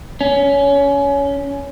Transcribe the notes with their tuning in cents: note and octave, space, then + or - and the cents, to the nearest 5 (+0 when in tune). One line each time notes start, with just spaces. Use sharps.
C#4 +20